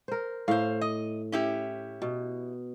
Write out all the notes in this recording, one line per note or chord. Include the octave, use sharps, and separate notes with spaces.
A#4 C5
A2 C5 F5
D#5
C#4 E4 G4
B2